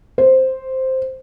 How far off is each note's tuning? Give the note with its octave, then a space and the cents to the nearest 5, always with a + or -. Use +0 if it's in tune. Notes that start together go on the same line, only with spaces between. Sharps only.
C5 +0